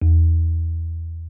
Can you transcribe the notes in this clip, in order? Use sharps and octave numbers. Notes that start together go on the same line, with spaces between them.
E2